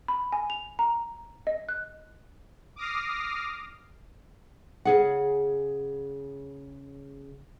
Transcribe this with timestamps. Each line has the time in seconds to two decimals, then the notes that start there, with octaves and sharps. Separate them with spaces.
0.08 B5
0.32 G#5
0.50 F7
0.79 A#5
1.47 D#5
1.69 F#6
2.76 D6 D#6 F6 A#6 C7
4.85 C#3 G#4 F#5